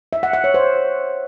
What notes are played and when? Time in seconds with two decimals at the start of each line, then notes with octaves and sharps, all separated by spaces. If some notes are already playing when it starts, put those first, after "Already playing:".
0.13 E5
0.23 F#5
0.33 F#5
0.44 C#5
0.54 C5